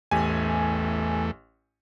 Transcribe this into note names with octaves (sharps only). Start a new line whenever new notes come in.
A1 E2 A3 G4 G#5